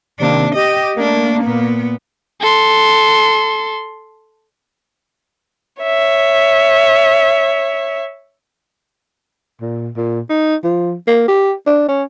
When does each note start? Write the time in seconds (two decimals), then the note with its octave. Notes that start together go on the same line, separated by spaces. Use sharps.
0.19 C3 D#3 A#3 D4
0.55 G4 D#5
0.96 A3 A#3 D4
1.43 A#2 B3
2.41 A4 C6
5.83 C#5 E5
9.61 A#2
9.97 A#2
10.29 D#4
10.64 F3
11.08 A#3
11.28 G4
11.67 D4
11.89 C#4